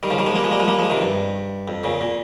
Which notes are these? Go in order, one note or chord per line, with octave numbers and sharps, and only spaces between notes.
D#3 G3
C#3 F3
D#3 G3
F3 G#3
G3 A#3
F3 G#3
G3 A#3
F3 G#3
G3 A#3
F3 G#3
C3 D#3
G2
F2
A#2 C#3
A#2